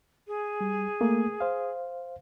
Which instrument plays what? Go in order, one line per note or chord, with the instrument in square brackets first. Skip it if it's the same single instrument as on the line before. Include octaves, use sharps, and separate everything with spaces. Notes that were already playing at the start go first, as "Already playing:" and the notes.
[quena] G#4
[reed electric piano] G3
A3 A#3
C5 F5